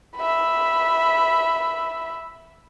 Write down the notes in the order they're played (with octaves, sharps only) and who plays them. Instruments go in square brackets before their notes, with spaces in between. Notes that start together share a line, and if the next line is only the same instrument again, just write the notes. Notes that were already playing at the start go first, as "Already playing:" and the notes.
[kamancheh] E5 B5